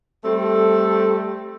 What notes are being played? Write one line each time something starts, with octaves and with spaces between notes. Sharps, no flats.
G3 A3 C4 A4